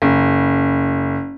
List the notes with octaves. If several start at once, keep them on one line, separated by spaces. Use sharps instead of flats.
F#1